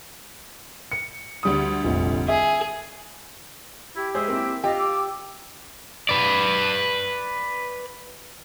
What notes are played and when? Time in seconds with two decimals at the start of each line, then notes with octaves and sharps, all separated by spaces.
0.92 C#7
1.43 D2 G3 D#6
1.84 F1 A#1
2.28 G#4 E5
3.96 E4 G4
4.14 G#3 G#4 C5 E5
4.28 A#3 C4 E4
4.64 F4 G4 D#5 F5
4.78 D6 E6
6.09 B4 D5